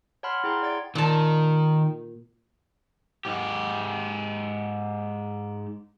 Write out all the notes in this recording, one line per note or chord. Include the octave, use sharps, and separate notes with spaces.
C#5 F#5 A5 B5 C6 F6
E4 G#4 G5 A#5 C6
D5 F#5 G#6 A6 D7
A#2 D#3 A5
G#2 G4